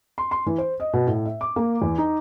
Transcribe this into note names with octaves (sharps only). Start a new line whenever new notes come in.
C6
C6
E3
C5
D#5
B2
A2
E5
D6
A#3
E2
D#4